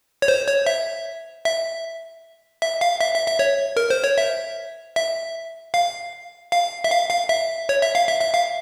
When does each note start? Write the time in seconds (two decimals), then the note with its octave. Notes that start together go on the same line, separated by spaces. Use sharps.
0.22 C#5
0.28 C5
0.48 C#5
0.66 E5
1.45 E5
2.62 E5
2.81 F5
3.01 E5
3.14 E5
3.27 E5
3.39 C#5
3.77 A#4
3.90 C5
4.04 C#5
4.18 E5
4.96 E5
5.74 F5
6.52 F5
6.84 E5
6.91 F5
7.10 F5
7.29 E5
7.69 C#5
7.82 E5
7.95 F5
8.08 E5
8.21 E5
8.34 F5